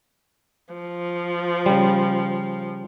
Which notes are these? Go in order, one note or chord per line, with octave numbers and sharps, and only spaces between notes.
F3
C#3 G3